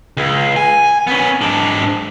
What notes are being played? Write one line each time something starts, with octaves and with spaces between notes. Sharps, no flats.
C#2
G#5
B3 C#4
G#2 D4